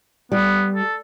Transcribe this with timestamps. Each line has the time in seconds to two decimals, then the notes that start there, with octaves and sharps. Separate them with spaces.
0.32 G3 B3
0.75 A4